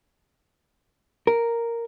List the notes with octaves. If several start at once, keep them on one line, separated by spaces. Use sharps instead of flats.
A#4